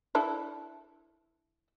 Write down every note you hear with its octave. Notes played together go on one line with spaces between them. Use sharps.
D4 E4 A4